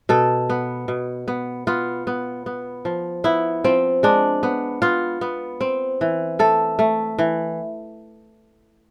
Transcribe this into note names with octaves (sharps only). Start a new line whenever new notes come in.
B2 A4
B3
B2
B3
B3 F4
B3
B3
F3
B3 E4
F3 C4
G#3 D4
B3
B3 F4
B3
C4
E3
A3 A4
A3
E3